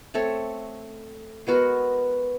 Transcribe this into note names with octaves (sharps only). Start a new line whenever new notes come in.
A3 C4 A4 C#5
G#3 B3 F#4 A#4